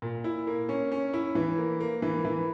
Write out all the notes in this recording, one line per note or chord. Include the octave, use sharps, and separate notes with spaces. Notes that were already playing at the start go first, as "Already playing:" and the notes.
A#2
E4
A#3
C#4
C#4
E4
E3
A#3
A#3
E3
E3